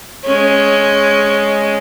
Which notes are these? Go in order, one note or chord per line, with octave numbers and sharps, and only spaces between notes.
G#3 C#4